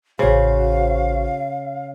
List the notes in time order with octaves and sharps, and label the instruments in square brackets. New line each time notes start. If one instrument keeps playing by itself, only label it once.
[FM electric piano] A1 C5 [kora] C#3 [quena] F#4 [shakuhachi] F5